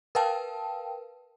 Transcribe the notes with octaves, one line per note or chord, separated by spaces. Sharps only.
A#4 B4 F5 G5 A5